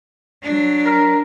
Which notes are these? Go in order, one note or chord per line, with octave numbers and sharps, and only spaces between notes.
F#3 D4
A#4